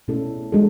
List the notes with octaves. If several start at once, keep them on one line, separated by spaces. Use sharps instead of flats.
B2 A3 C#4 E4 A4
G#3 D4 F#4 A4